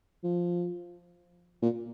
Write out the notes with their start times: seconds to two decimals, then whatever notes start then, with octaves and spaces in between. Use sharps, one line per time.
0.24 F3
1.62 A#2